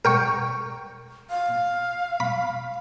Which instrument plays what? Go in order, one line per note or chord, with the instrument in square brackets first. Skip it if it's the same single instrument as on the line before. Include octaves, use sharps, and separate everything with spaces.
[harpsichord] A#4 G5 C#6
[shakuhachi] F5
[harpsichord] B5